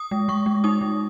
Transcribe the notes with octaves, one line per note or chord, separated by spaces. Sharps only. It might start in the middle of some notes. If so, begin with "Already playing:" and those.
Already playing: D#6
G#3
G#3 C#6
G#3
D#4 D#6
G#3